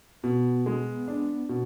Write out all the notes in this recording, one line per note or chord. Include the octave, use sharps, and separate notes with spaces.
B2 B3
G#3
D4
B2